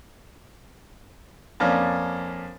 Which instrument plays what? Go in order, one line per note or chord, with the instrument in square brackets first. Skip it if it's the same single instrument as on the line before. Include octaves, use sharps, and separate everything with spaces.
[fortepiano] F2 A#3 C#4 D4